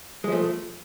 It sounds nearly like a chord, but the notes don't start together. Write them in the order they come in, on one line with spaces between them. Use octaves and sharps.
G#3 F3 A3